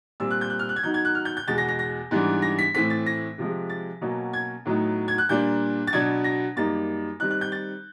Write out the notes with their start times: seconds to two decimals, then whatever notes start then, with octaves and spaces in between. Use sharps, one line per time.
0.20 A#2 G3 C4 E6
0.31 F#6
0.41 G6
0.50 F#6
0.59 F6
0.69 F#6
0.76 G#6
0.83 D#3 F#3 B3 D#4 G6
0.94 G#6
1.05 F#6
1.15 F6
1.25 G6
1.37 G6
1.47 E2 B2 G#3 A6
1.58 A#6
1.68 A#6
1.79 A#6
2.11 G#2 E3 G3 B3 D4
2.42 A#6
2.59 B6
2.75 A2 E3 A3 C4 B6
2.90 A6
3.06 A#6
3.38 C3 F3 G#3
3.70 A6
4.01 B2 F#3 A#3 C#4
4.33 G#6
4.66 A2 F#3 B3 D#4
5.08 G#6
5.18 F#6
5.29 A#2 G3 A#3 D4 G6
5.87 A6
5.93 B2 F#3 B3 D4 G#6
6.24 A#6
6.56 F#2 D#3 G3 A#3 D#4 A6
7.20 D#3 G3 C4 D#4 F#6
7.31 F#6
7.41 G6
7.52 A6